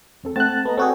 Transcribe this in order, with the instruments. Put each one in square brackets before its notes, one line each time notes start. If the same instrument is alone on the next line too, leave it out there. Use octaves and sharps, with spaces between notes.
[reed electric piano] E2 C4 A4
[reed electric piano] A3 C4 F#5 [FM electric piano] A5 F#6
[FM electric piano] B3 [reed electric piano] A4 D#5 A#5
[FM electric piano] C4 F#4 G#4 [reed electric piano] A4 D5 G5